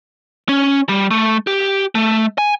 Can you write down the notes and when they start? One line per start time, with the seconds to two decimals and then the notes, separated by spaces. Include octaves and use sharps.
0.49 C#4
0.89 G3
1.11 A3
1.47 G4
1.95 A3
2.38 G#5